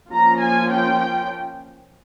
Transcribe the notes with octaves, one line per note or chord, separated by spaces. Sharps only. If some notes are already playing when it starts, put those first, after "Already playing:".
F3 A#3 C#4 F4 A#5
G#5
G5